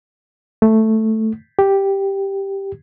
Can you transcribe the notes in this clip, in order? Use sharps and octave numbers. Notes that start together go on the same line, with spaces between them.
A3
G4